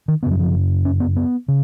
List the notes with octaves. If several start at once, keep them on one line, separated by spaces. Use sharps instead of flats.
D#3
F#2 C#3 B3
F#3
F3
C#4
B3
B3
C#3